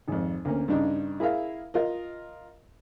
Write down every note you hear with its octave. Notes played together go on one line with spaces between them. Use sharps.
G#1 F2
D2 A#3 C#4
G2 C#3 D4 D#4
E4 G#4 A#4 E5 F5
F4 A#4 D#5